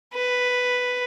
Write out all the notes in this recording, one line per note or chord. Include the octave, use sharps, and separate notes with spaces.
B4